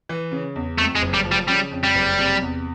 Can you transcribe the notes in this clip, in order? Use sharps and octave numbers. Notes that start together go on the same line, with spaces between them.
E3
C#3
E2
F2 A3
G#3
F#1
G3
F3
G3
C#3 G3
F2
G3
F#1
C3
E2